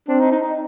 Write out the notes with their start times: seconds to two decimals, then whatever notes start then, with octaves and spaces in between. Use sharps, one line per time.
0.08 C4 D4
0.20 D#4
0.32 D#4
0.43 D#4